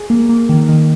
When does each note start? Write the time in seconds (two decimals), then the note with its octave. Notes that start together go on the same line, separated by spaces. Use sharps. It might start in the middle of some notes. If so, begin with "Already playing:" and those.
Already playing: G#4
0.10 A#3
0.29 A#3
0.49 D#3
0.69 D#3